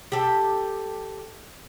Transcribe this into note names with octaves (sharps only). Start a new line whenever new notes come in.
G4 A4